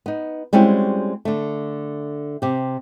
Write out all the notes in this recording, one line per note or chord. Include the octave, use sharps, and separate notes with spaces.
B3 D#4
G3 G#3 C4 C#4 E4 F#4
D3 A3
C3 G4